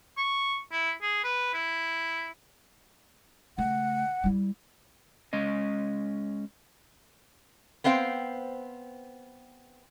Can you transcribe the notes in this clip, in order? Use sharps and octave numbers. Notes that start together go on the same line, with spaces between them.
C#6
E4
G#4
B4
E4
C#3 A3 F#5
G3 E4
G#3 C#4 D#5
B3 C4 C5 F5 G5